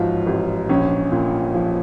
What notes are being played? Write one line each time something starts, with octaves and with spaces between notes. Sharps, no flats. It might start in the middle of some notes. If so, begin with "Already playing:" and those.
Already playing: A1 G#2 F3 F4 F#4
A1
A#1 C#4
A#2
F3